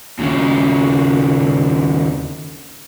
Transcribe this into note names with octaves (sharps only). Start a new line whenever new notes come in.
D#2 C#3